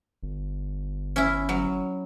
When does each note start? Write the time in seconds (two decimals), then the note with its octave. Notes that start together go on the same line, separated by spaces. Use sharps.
0.23 G1
1.16 C#4 E4
1.49 F#3